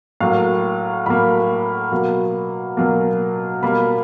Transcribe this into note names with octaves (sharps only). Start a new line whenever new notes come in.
A2 F#3 A#3 F5
A2 F#3 A#3 B5
B2 F#3 A#3
B2 F#3 A#3
B2 G3 A#3 B5